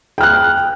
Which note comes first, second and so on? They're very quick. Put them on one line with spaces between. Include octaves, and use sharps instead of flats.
G5 F6 F#6